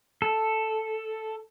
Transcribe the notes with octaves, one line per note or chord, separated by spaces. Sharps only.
A4